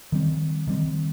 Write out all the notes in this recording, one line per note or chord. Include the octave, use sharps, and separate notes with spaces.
D#3 G3 C4
D#3 G3 C4